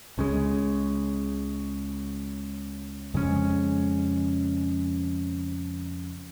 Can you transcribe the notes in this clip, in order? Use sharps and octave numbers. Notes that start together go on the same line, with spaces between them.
C#2 C#3 G#3
F2 C#3 G#3 C#4